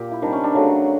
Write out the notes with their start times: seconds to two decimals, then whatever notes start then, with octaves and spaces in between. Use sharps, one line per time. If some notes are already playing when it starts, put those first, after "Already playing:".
Already playing: A#2 G4
0.12 E4
0.22 C3 D#3 G3 D4
0.33 C#4
0.44 D4
0.54 C#3 F#3 A3